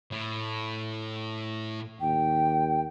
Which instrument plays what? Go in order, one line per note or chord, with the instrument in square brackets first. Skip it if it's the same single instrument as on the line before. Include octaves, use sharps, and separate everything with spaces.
[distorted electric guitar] A2
[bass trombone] D#2 [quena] G5